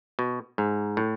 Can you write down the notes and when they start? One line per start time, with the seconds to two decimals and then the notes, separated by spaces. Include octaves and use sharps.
0.19 B2
0.58 G#2
0.97 A2